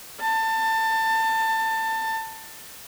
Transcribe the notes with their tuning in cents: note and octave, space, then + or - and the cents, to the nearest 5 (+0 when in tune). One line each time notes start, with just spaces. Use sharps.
A5 +25